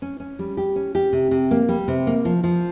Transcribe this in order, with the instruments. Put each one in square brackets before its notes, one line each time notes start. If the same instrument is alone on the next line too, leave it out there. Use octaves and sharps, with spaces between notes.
[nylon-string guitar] C#4
C#4
G3
G4
C#4
G4
C3
C3
A#3
G3
C3
A#3
F3
F3